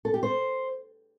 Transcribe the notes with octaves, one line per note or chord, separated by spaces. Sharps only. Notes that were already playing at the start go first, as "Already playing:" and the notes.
A4
G4
C5